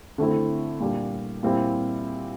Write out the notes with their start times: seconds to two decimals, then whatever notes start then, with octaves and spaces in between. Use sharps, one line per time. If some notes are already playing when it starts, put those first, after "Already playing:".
0.18 D3 A3 C4 E4
0.80 A#2 G3 D4
1.43 A#2 G3 C4 E4